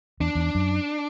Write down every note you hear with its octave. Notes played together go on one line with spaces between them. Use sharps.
E2 D4
E2
F#2